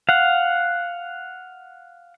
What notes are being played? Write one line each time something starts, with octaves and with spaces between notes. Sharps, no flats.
F5 F#5